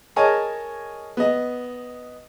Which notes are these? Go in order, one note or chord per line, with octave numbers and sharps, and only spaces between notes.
G#4 A#4 C#5 D#5 G#5 A5
B3 D#5